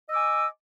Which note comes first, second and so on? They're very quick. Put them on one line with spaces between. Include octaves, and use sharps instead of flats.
D#5 E6 D6 G#5